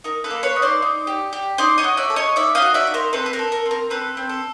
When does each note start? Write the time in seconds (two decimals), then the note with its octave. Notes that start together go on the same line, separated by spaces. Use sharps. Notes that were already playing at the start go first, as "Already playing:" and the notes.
0.04 D#4 A#4
0.24 A4 B4
0.31 A#3
0.43 B4 C#5
0.56 D#4
0.62 C5 D5
0.82 D#4
1.07 G4
1.33 G4
1.58 D#4 C5 D5
1.78 C#5 D#5
1.84 F#4
1.97 D5 E5
2.10 A4
2.16 C#5 D#5
2.36 D#4 D5 E5
2.55 D#5 F5
2.62 F#4
2.74 D5 E5
2.87 D#4
2.94 A#4 C5
3.13 C4 A4 B4
3.26 B4
3.33 A#4
3.39 A4
3.52 A#4
3.66 C4
3.71 A#4
3.90 C4 A4 B4
4.17 C4
4.29 A4